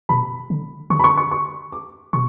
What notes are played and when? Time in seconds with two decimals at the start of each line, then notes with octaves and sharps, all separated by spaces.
0.09 B2 B5
0.50 D3
0.90 D3 C#6
0.99 B5
1.04 C#6
1.17 C#6
1.31 C#6
1.72 D6
2.13 B2 C#6